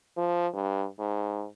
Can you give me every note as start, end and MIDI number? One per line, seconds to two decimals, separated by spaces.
0.17 0.47 53
0.54 0.85 43
0.99 1.45 44